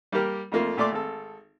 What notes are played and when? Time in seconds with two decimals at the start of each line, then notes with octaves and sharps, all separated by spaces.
0.12 G3 A#3 G4 A#4
0.52 F2 A3 A#3 F4
0.77 A#2 A3 D5 C6 D6
0.92 G#1 A4